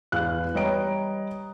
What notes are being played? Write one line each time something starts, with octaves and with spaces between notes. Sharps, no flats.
E2 F5 F#6
G3 B4 C#5 D#5 A#5 D7